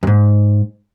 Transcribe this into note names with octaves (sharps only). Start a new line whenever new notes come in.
F2 G#2